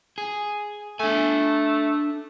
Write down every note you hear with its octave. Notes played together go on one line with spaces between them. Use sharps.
G#4
A3 D4 G#5